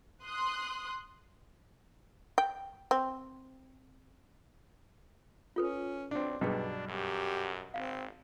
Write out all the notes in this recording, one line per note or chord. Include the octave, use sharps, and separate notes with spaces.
C6 D#6 F#6
G5
C4
C#4 F4 A4 B4
B1 C4 D4
B1 G2 B2 G3 D4 F#4 G#4 B4
F#2 G4
G#1 C4 F5